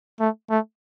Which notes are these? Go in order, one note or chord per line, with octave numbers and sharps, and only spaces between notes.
A3
A3